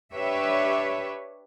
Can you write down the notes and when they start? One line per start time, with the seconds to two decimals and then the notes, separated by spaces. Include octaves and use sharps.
0.13 D4 G4 B4 C#5 E5